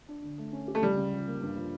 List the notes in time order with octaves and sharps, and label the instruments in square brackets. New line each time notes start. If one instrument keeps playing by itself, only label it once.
[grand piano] D4
D3
A3
C#4
G4
[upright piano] A3
[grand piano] C#2 [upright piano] G3
[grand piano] C#3
F3
A#3
G2
F3